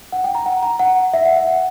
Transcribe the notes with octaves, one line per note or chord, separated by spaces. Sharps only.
F#5
G5
A#5
F#5
A#5
F#5
E5
F#5
E5
F#5